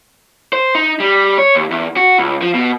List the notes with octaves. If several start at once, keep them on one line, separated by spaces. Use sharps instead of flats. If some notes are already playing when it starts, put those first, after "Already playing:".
C5
D#4
G3
C#5
D#2
E2
F#4
C#2
F3
B2